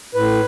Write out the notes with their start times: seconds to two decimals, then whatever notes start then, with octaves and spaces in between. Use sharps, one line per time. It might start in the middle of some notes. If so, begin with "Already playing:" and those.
0.15 A2 B4